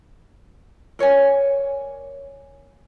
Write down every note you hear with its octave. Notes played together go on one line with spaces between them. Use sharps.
A#4 C#5 D5 G#5